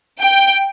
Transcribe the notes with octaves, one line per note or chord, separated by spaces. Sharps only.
G5